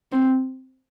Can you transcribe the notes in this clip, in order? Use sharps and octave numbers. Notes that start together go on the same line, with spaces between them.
C4